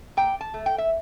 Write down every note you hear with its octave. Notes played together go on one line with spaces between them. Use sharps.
A#2 G5
A5
A3
G5
E5